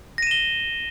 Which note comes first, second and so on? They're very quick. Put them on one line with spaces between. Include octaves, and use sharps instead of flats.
A#6 D#7 E7 G7